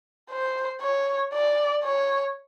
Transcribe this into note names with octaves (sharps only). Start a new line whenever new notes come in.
C5
C#5
D5
C#5